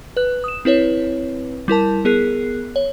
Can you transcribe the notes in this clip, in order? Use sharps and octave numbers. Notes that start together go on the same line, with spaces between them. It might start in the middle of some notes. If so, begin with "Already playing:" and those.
B4 F#6
D#6 E7
C4 E4 B4 C#5
G3 E4 A#4 A5
B3 G#4 A#4 F#6 C7
C#5